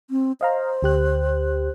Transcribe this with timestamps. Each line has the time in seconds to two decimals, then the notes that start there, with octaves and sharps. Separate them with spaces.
0.10 C4
0.41 C5 D#5 F5 A#5
0.83 D2 G4 F#6